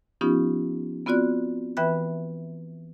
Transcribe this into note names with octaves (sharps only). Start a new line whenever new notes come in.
F3 B3 C#4 D#4 F4 G4
B3 C4 F4 F#4 D5 F#6
E3 B4 E5 G5 B5 F#6